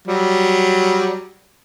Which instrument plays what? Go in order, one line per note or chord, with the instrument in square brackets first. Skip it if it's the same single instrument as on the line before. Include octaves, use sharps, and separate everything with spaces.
[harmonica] F#3 G3